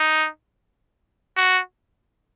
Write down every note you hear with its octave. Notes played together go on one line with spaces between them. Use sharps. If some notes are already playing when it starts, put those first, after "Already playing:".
Already playing: D#4
F#4